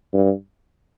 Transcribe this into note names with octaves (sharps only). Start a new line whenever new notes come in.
G2